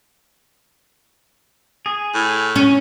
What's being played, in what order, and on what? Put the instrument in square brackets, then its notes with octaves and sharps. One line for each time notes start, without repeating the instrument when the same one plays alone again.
[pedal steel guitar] G#4
[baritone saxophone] A2
[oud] C#4